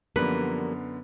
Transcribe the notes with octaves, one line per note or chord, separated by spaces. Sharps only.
F#2 D3 F3 G3 A#3 B3 B4